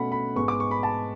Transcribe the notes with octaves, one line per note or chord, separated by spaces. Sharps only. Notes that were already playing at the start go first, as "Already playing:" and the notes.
Already playing: B2 A3 C#4 F#5 B5
B5
G#2 G#3 B3 C#6
D6
C#6
B5
A5